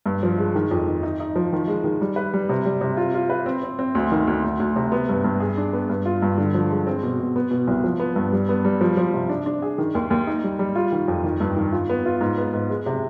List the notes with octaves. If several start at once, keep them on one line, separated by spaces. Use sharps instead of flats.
G2
F3
G#3
D#3
F2
D#3
D#4
D#4
F3
D#3
G#3
D#3
G3
B4
G3
C3
G3
C3
F4
F4
B4
C4
C4
C4
D2
D#3
D2
D2
D2
C3
B3
G2
G2
G#4
D4
B3
G2
F4
G2
D3
F3
G#3
C4
B2
B2
B3
B2
C2
F3
B3
G2
G3
B3
G3
F3
F3
C3
D4
D4
G#4
D#3
D#2
D#2
D#4
G3
G3
F4
D#3
F2
D#3
G2
D#3
F4
B3
F4
G#2
B3
G#2
G#3
C3